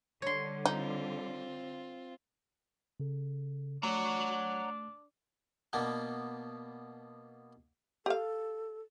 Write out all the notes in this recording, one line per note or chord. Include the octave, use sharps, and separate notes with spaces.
D3 G3 C#5 C6
C4 D#4 F4
C#3 A4
A3 D4 C#5 F#5 A#5
B2 A#3 B3 D4
G4 A4 F5